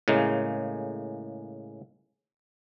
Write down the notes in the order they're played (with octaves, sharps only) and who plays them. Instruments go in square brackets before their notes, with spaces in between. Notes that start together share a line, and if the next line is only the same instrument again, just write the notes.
[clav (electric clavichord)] A2 C#3 G#3 A#3